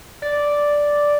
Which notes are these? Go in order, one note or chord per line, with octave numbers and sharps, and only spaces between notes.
D5